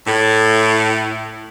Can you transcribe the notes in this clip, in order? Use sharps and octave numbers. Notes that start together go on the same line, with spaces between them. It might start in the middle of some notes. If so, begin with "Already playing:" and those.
A2